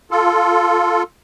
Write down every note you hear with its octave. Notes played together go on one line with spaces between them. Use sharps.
F4 A4